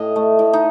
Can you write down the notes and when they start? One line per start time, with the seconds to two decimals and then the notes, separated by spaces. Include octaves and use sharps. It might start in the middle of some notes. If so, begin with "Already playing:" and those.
Already playing: A2 D#5
0.16 A3
0.39 A2
0.53 D#4